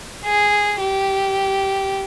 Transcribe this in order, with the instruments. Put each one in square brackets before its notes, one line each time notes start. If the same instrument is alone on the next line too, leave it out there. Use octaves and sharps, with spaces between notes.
[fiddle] G#4
G4